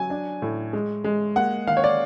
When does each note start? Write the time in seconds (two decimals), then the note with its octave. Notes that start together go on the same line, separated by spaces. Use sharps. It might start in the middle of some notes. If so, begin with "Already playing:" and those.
Already playing: F#3 G#5
0.10 D4
0.42 A2
0.73 G#3
1.04 G#3
1.36 A#3 F#5
1.67 D#3 F5
1.77 C#5
1.84 D5